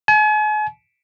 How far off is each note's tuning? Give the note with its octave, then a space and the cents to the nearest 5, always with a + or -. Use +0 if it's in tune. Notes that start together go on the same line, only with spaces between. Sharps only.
G#5 +40